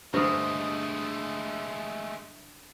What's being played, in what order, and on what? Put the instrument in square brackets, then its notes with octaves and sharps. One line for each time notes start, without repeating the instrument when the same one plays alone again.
[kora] G2 D3 A#4 [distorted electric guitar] G#3 A3 [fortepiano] C5 [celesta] C#6 D#6